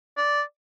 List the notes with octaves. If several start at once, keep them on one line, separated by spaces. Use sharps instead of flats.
D5